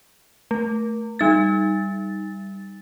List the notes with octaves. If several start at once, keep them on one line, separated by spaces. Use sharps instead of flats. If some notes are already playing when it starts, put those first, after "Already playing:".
A3
G3 D#4 A6